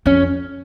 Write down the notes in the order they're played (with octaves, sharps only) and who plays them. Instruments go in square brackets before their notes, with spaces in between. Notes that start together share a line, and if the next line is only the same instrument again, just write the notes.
[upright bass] F2 [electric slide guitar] C#4